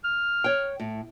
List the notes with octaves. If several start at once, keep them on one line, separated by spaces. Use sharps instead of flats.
F6
C#5 G5
A2